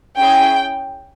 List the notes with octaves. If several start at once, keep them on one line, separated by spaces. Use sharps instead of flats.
C#4 E4 G#4 G5